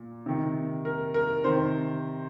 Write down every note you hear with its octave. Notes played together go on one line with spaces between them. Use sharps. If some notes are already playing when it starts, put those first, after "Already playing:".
Already playing: A#2
C3 D#3
A#4
A#4
C3 D#3 C5